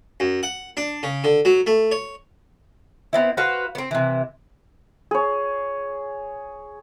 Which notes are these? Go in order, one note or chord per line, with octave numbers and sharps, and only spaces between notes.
F#2
F#5
D4
C#3
D3
F#3
A3
C#5
B3 C4 E4
F#4 B4 C5 F5
B3 C4
C3 E3
G#4 C#5